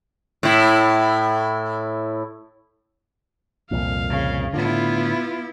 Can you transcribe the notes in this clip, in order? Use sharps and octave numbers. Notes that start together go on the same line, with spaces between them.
A2 E4
C2 F2 A#2 F5
C#3
A2 D3 B3 E4 F4